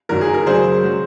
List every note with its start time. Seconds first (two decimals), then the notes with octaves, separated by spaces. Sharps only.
0.09 F#1 F#2 D#3 F#3 A#4
0.21 G#4
0.34 A#4
0.46 F#2 C#3 F#3 G#4 C5
0.84 F#3